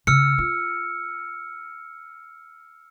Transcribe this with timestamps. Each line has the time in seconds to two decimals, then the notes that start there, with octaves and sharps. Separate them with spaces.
0.07 C#3 E6 F6 C#7
0.38 F4